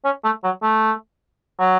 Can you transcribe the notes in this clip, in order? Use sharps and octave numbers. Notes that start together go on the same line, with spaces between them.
C#4
A3
F#3
A3
F#3